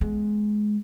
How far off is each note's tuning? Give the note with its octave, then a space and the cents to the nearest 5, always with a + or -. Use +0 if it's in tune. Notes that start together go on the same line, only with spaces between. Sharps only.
G#3 +15 B3 +10